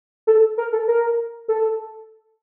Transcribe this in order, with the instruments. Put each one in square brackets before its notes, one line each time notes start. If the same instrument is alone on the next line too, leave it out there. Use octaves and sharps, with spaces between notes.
[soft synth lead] A4
A#4
A4
A#4
A4